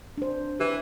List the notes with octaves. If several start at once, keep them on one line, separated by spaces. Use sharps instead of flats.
D4 C5
E3 G4